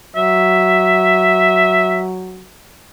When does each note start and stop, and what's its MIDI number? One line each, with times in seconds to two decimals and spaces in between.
0.16 2.48 54
0.16 2.04 76